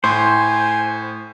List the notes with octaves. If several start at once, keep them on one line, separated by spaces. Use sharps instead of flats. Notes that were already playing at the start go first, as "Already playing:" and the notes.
A2 C5 G#5